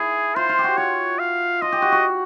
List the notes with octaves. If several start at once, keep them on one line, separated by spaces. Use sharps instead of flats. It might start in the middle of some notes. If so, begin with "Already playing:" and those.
Already playing: E4 G#4
F4 C5
F4
G4
F#4
F4 C#5
F5
F4 D#5
G4
F#4
F#4